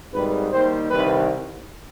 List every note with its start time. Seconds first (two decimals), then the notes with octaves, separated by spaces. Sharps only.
0.12 G#1 G#2 D#3 G3 B4
0.52 D#2 D#3 G3 C5
0.91 C2 C3 D#3 G3 B4